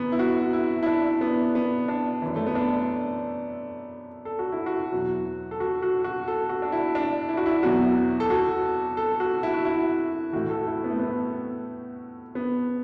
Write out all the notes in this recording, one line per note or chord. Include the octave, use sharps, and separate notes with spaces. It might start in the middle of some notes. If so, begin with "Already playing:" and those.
Already playing: F#2 D3 B3
E4
F#4
E4
E4
D4
B3
B3
D4
F#2 E3
A3
B3
D4
A4
F#4
E4
F#4
E2 B2 F#3
A4
F#4
F#4
F#4
A4
F#4
D4
E4
D4
E4
F#4
E4
E2 B2 F#3 F#4
A4
F#4
A4
F#4
E4
F#4
E4
A2 E3 F#4
A4
E4
B3
A3
B3
B3